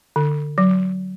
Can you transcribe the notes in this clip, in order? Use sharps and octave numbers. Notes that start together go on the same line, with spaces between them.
D3
F#3